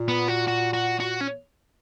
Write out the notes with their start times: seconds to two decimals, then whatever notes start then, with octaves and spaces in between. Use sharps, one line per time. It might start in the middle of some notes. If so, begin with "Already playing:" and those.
Already playing: A#2
0.08 B3
0.28 F#4
0.48 F#4
0.73 F#4
1.00 F#4
1.21 C#4